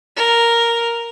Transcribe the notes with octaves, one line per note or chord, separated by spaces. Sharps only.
A#4